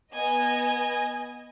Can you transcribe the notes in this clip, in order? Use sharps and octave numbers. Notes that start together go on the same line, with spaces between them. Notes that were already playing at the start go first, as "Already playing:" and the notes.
B3 D#5 G#5